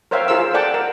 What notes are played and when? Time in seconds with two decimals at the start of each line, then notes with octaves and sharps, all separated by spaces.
0.11 A#4 C5 C#5 E5 F5 G5
0.28 F4 G#4 A#4 C5 F5 E6
0.54 A4 D5 F#5 G5 A5
0.74 A#4